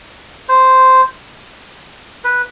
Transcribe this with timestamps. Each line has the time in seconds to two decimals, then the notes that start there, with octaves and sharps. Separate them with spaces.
0.49 C5
2.24 B4